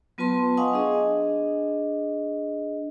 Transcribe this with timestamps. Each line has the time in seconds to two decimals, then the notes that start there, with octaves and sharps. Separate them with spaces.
0.18 F#3 B3 F4 B4 A5 C6
0.57 D#5 F5 F#5 G#5 C#6 D#6
0.73 D4 G#4 D#5